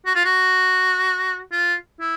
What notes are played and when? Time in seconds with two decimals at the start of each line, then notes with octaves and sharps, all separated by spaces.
0.06 F#4
0.15 F4
0.25 F#4
1.52 F4
2.01 E4